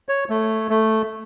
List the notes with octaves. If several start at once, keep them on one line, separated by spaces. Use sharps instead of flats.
C#5
A3
A3